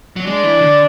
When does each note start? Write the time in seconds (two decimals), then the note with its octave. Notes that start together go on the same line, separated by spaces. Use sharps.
0.16 F#3
0.26 G#3 D4
0.43 E3
0.61 D3